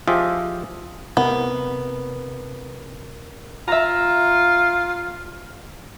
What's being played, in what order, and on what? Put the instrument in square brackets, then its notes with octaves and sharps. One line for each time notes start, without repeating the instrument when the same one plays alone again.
[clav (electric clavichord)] F3 F4 G4 G#4 D#5 E5
[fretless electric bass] C3 [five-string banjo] B3 [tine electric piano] A#4
[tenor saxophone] F4 [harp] E5 A#5